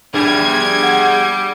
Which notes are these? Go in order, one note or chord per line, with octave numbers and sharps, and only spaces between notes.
G3 D4 G#4 D5 G#6
F#5